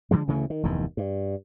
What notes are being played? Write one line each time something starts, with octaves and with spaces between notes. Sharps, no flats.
D3 E3 F3 G#3
D2 C#3 E3 A3
D#3
F1 E2 G2 D#3
G2